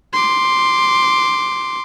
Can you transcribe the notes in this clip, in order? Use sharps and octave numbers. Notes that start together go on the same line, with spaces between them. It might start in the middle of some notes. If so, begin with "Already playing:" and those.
C6 D6